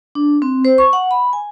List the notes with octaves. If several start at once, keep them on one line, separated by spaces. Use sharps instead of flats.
D4
C4
C5
C#6
F#5
B5
G#5